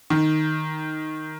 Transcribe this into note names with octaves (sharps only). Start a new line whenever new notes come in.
D#3